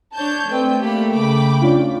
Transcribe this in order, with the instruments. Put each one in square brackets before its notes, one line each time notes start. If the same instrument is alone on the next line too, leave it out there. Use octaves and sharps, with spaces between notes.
[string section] D4 C#5 A5 [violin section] G6
[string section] A3 [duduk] C4 [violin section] B4 D5 G5
[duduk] A#3 [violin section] G4 B5
[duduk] C#3 [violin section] G5 B5 D6
[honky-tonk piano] C#4 D4 F4